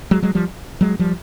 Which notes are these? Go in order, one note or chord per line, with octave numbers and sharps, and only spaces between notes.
F#3 G#3
F#3 G#3
F3 G3
F#3 G#3
F3 G3